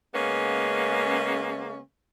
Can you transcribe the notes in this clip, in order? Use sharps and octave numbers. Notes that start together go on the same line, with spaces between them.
C#3 G#3 A#3 B3 C#4